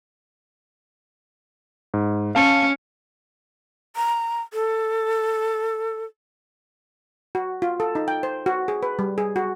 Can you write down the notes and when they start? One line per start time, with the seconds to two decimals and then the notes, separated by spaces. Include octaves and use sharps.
1.94 G#2
2.35 C#4 F5 A5
3.96 A#5
4.53 A4
7.35 F#4
7.62 F4
7.80 A4
7.95 D#4
8.08 G5
8.23 C5
8.46 F#4
8.68 G#4
8.83 B4
8.99 G3
9.18 G#4
9.36 F#4